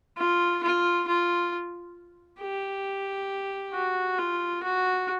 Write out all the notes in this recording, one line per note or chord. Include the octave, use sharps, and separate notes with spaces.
F4
F4
F4
G4
F#4
F4
F#4